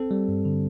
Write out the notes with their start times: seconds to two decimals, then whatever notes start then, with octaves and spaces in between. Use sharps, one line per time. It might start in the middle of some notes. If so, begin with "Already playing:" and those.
Already playing: C4 A4
0.11 G3
0.28 G2
0.45 D3